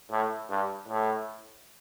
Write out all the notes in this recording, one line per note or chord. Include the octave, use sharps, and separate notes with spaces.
A2
G2
A2